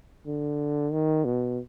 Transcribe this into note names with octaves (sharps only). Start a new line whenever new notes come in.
D3
D#3
B2